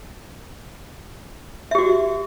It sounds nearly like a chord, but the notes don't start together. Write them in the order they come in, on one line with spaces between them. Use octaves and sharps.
E5 G4 F#4